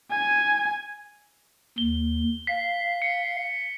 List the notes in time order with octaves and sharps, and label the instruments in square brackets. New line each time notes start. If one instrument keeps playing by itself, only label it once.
[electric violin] G#5
[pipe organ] D#2 [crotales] G7
[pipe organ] F5 [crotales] B6
[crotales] C#7